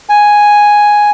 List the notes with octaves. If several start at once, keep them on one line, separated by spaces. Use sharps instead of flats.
G#5